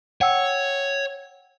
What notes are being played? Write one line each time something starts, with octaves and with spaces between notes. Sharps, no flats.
C#5 F#5 G5 E6